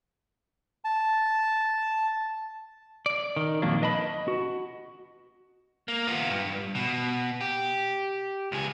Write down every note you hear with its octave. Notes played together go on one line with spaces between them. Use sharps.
A5
D5
D#3
F2 A#2 D#3 F#3 A#3 D4
B4 D#5 A5 B5
F#4
A#3
B3 F4
G2
B2
G4
C#2 G#4